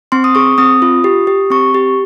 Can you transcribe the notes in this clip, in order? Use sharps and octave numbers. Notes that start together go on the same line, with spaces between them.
C4 C6
D#6
G#4 C#6
C4 D#6
F4
G4
G4
C4 C#6
G4